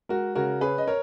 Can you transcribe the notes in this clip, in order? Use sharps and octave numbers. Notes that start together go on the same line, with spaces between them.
G#3 F#4 A#4
C#3 F#4 A#4
C#4 G#4 B4
D#5
A#4 C#5